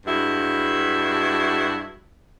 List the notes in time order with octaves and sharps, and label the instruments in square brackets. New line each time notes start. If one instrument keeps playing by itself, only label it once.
[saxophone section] G2 G#3 E4 F#4